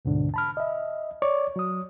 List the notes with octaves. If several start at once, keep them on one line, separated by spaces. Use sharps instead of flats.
D2 G#2 B2 D3 D4
A5 B5 F6
D#5 E5
C#5 D5 C#6 D6
F#3 D#6